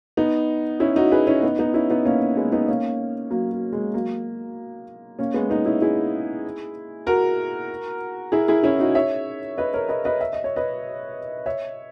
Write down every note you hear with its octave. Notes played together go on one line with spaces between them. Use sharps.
B3 D#4
C#4 E4
D#4 F#4
G#4 B4
C#4 E4
B3 D#4
B3 D#4
C#4 E4
B3 D#4
A#3 C#4
G#3 B3
B3 D#4
A#3 C#4
F#3 A#3
F#3
G#3
F#3 A#3
A#3 C#4
G#3 B3
B3 D#4
C#4 E4
E4 G#4
F#4 A#4
E4 G#4
E4 G#4
C#4 E4
D#4 F#4
C#5 E5
B4 D#5
A#4 C#5
B4 D#5
B4 D#5
E5
D#5
C#5
B4 D#5
C#5 E5